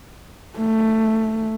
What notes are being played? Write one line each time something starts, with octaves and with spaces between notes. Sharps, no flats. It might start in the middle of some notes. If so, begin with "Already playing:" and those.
A3